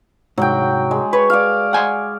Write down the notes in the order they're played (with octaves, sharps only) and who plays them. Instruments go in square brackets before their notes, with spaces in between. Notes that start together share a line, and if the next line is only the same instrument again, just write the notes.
[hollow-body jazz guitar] C2 G#2 [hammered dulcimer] F#3 G5
[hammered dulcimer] G#3
[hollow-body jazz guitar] B4 [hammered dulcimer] C#5
[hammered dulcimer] D5 F5
[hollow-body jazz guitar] F#5 G#5 C6